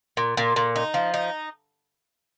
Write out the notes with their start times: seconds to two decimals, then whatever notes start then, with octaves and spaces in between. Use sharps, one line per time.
0.17 A#2
0.37 A#2
0.56 A#2
0.76 D#4
0.94 F3
1.14 D#4